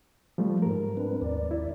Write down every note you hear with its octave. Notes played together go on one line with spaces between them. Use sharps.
F3 G3 A3
G#2 A#4
C4 D4 B4
D#2 D5
E4